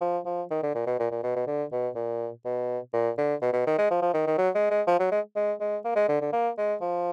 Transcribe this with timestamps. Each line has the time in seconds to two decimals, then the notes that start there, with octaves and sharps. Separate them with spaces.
0.01 F3
0.25 F3
0.51 D#3
0.63 D3
0.75 A#2
0.86 B2
0.99 A#2
1.11 A#2
1.23 B2
1.36 B2
1.47 D3
1.72 B2
1.95 A#2
2.45 B2
2.93 A#2
3.18 D3
3.41 B2
3.53 B2
3.66 D#3
3.78 G#3
3.90 F3
4.02 F3
4.14 D#3
4.27 D#3
4.38 F#3
4.55 G#3
4.70 G#3
4.87 F3
4.99 F#3
5.11 G#3
5.36 G#3
5.60 G#3
5.85 A#3
5.96 G#3
6.09 D3
6.21 D3
6.32 A#3
6.57 G#3
6.81 F3